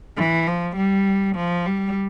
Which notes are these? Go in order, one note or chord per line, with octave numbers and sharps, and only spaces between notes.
E3
F3
G3
F3
G3